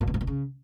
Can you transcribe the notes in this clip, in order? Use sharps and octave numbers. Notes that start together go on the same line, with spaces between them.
A2
B2
G#2
A#2
C#3